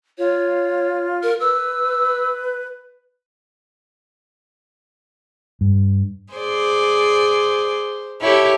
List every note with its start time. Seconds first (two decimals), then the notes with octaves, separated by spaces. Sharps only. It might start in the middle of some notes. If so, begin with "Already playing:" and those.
0.18 F4 C#5
1.23 A#4
1.40 B4 E6
5.61 G2
6.33 G#4 C5 D5
8.22 E4 G4 A4 C#5